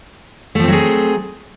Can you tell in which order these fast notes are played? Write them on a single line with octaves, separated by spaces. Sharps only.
A3 F3 C4 F#3 G#4